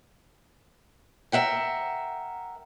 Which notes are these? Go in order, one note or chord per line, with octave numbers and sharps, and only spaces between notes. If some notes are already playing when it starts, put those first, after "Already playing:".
A#4 E5 F#5 G5